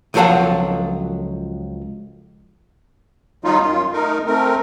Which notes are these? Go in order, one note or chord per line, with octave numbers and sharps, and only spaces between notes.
C#2 F3 F#3 A4 F5 F#5
D#3 F#3 G3 D#4 F4
F#2 F4
A3 D#4 A#4
A3 C4 A#4